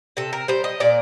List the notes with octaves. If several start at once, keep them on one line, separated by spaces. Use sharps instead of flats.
C3 A4
A#4
G3 C5
D#5
A#2 D5